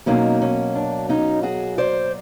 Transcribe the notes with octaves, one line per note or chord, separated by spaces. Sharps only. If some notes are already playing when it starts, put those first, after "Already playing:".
B2 F#3 A#3 C#4 D#4
C#4
D4
C#4 D#4
F#4 G#4
C5 D5